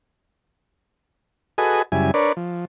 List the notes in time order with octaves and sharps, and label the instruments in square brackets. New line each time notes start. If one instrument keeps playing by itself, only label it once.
[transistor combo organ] F#4 G#4 A4 B4 D#5 G#5
F#2 C#3 G3 E4 G#5
D4 A#4 B4 C#5 D5
F3